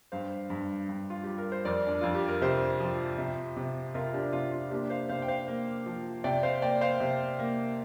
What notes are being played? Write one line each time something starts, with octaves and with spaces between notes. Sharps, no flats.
G2 C5 F5
G2
G2
F4
G3 G4
A#4
C5
F2 A#4 D5
D4
F2 F4
G4
A#4
C3 G4 C5
F3
C3
C3
C3 F4 A#4
D4 G4
C3 F4
F4
A#3 D4 G4
C5 F5
C3 C5 F5
G5
C5 F5
A#3
F3
C3 D5 G5
C5 F5
A#3 D5 G5
C5 F5
C3
A#3